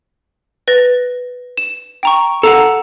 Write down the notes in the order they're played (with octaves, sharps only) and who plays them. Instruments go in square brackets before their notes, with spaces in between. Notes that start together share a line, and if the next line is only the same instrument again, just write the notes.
[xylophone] B4 A6 A#6
E7
G5 A#5 C#6
[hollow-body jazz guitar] A4 F5 F#5 [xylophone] A#5